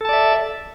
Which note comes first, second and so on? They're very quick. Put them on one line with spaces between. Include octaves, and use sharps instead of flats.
A4 A5 D5 E5